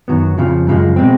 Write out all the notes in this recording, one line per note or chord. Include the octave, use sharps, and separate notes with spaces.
F#2 D#3 F#3 B3
F2 C#3 F3
F#2 C#3 F3 G#3
B2 G#3 C4